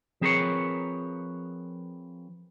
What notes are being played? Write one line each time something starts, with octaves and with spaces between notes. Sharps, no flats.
F3 C4 G#4 A#4 B4 C#5